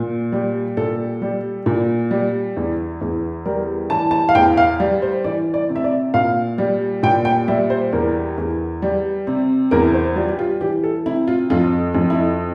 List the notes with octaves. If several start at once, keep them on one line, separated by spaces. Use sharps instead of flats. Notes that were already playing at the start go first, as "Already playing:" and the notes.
Already playing: A#2
G3
A#2 A4
G3
A#2
G3
E2
E2
G3 A#4
E3 A5
A5
F5
E2 G5
F5
G3
C5
E3 D5
D5
C3
E5
D5
A#2 F5
G3
A#2 G5
G5
G3 E5
C5
E2 A#4
E2
G3
C3
E2 A#4
C5
G3 F4
G4
F4
E3 G4
A4
C3 E4
F4
F2 F4
F2
E4